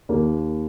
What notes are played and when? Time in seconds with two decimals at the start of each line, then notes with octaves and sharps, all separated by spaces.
0.09 D#2 A#3